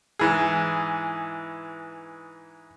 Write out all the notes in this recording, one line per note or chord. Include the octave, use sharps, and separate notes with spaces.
G#2 E3 G#4